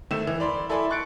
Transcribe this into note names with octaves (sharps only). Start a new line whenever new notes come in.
G#1 D#3 A3 E6 E7
E3
D5 B5 C6
E4 A4 D5 G#5 B5 C6
C#6 F#6 A6 C#7 D7